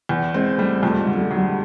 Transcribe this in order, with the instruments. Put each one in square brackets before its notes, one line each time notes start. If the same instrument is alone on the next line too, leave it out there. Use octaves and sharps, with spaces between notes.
[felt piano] E2
[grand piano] G#3 [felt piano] C4
[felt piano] G3 [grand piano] A3
[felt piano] F2 [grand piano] A3
[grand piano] G#3
[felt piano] D3
[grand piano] G3
[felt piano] F#3
[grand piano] G3